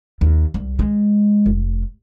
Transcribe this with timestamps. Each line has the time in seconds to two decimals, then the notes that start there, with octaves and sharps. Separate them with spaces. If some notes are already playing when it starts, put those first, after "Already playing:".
0.21 D#2
0.54 C2
0.79 G#3
1.46 F1